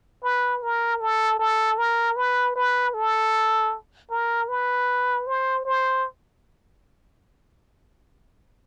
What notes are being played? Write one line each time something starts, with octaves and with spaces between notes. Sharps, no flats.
B4
A#4
A4
A4
A#4
B4
B4
A4
A#4
B4
C5
C5